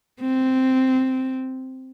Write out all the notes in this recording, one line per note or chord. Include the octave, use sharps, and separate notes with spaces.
C4